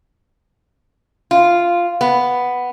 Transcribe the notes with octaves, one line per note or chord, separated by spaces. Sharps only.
F4
B3